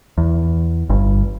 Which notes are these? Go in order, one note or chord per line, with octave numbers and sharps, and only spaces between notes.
E2
G1 G2